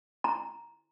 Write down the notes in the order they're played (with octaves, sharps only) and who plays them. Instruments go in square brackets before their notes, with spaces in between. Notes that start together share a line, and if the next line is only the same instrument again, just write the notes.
[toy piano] A#5